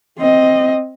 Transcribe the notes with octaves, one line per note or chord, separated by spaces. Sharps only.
C4 D#5